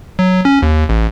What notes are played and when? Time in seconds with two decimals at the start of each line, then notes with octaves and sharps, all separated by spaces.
0.19 F#3
0.45 C#4
0.62 D#2
0.89 A1